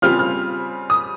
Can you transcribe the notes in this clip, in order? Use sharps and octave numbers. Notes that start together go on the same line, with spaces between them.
C#3 G3 C4 F4 F6
F6
D#6